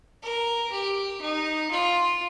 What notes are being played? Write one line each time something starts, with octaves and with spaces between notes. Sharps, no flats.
A#4
G4
D#4
F4